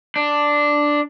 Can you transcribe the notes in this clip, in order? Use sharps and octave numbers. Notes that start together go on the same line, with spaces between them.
D4